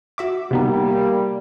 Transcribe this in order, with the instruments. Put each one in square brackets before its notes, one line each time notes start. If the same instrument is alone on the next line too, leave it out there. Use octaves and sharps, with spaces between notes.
[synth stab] F#4 E5 D6
[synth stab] C3 B3 D#4 [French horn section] G3 A#3